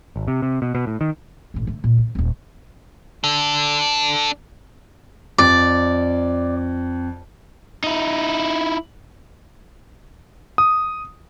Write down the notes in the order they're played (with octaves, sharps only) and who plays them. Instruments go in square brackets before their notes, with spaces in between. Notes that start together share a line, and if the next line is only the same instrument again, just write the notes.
[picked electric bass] G#1
C3
C3
B2
B2
A2
D#3
[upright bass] A1 A2
D3 A3
A#2
C3
D#1 G#1
[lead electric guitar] D4 A4
[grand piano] F2 [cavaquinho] D5
[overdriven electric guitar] D#4 E4
[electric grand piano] D#6